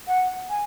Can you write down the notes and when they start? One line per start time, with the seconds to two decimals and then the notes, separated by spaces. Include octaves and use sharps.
0.07 F#5
0.50 G#5